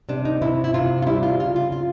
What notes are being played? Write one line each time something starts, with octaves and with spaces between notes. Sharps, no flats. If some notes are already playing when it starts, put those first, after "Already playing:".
C3 D4
D#4
C3 E4
E4
C3 F4
F4
G3 E4
F4
C#3 F4
F4
F4